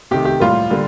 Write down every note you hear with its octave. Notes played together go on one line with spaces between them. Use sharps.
C3 D#3 A3 G4
G4
A2 G3 A#3 F4
D3 G3 A#3